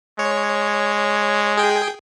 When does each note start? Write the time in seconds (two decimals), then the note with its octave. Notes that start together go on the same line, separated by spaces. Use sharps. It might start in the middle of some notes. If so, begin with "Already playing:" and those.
0.19 G#3 C#5
1.57 G#4 G5